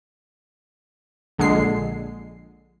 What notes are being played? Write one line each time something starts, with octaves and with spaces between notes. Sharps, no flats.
A#1 D3 G#3 C7